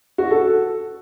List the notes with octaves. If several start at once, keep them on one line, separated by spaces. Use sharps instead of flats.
F#4
A4